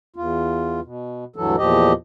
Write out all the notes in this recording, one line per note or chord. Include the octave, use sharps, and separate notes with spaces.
E2 F4
B2
D2 G2 E3 F#3 A4
E2 A#2 F3 G4 D#5